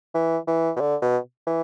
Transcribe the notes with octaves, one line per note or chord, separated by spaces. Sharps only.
E3
E3
B2
D3
B2
E3